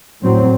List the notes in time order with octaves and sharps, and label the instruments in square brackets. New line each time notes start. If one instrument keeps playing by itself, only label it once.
[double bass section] A2 F#3 C4